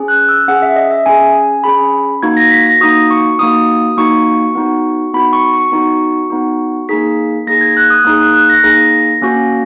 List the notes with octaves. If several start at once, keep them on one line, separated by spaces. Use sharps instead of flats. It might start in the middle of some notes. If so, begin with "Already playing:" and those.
Already playing: C#4 G#4
F#6
E6
C#4 G#4 F#5
E5
D#5
E5
C#4 G#4 G#5
C#4 G#4 B5
A#3 D#4 F#4 G#6
A#6
B6
A#6
A#3 D#4 F#4 D#6
C#6
A#3 D#4 F#4 D#6
A#3 D#4 F#4 C#6
B3 D#4 F#4
B3 D#4 F#4 B5
C#6
C#6
B3 D#4 F#4
B3 D#4 F#4
A#3 D#4 G#4 B6
A#3 D#4 G#4 A#6
G#6
F#6
D#6
A#3 D#4 G#4 D#6
F#6
F#6
A#6
A#3 D#4 G#4 A#6
A#3 C#4 F#4